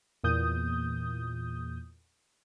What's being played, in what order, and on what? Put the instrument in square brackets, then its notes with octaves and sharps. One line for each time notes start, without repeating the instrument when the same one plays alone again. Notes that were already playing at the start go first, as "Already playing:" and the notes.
[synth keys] E2 A#2 D#6 G6